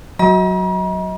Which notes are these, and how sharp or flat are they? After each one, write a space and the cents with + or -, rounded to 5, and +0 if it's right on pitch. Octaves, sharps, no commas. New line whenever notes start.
F#3 +0 D#5 +35 A#5 +45